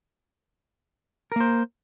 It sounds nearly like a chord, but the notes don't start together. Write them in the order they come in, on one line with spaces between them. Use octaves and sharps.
A#4 A#3 C5